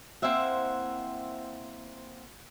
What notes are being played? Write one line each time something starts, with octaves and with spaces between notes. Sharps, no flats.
A#3 C4 E4 C5 E5 F#5